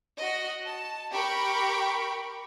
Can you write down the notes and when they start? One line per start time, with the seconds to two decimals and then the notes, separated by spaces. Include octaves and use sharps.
0.18 F#4 D#5
0.65 A5
1.12 G4 A#4 G5 B5 C#6 D7